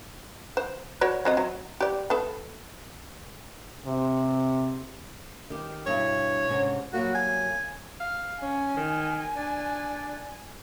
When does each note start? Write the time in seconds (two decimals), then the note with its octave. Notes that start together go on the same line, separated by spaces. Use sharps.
0.57 C5
1.01 F#4 C#5 D5
1.25 F#3 C4 D#5
1.37 F#3
1.81 G4 D5
2.10 B3 A4
3.86 C3
5.50 D#3 G4
5.87 G2 B2 E4 C#5
6.49 G#2 C3 C#4
6.93 F#3 G3 A#3 F#4
7.15 G#5
8.00 F5
8.42 C#4 G#5
8.77 D#3
9.36 D4